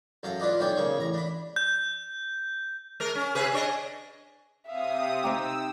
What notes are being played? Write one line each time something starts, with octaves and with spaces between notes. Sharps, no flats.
F#2 A4 F5 A#5
D4 F4 B4 D5 D#5
B1 C#4 C5 D5 G5
C#3 A#3 C#5
A1 A#5
D4 B5
G6
G#3 A#4
C#4
C3 G#4 B4
D4 C#5 D#5
C3 E5 F5 D#6
C4 D#4 G4 E6